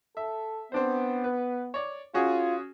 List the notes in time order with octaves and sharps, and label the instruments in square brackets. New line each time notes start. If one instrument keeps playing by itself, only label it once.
[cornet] A4 [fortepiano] E5
[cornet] B3 [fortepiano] C4 D4 C5
[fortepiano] B4
C#5 D5
[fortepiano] C#4 F#4 G#4 [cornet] F4